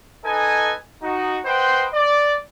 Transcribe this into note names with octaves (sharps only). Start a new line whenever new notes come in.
D#4 A4 B4 D#5 G#5
D#4 F#4
B4 C5 D#5 F#5 G5 C6
D5